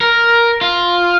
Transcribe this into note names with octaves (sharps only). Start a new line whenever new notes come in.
A#4
F4